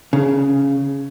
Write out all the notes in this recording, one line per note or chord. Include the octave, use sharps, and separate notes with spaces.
C#3